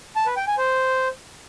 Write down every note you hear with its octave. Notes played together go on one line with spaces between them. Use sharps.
A5
B4
G5
G#5
C5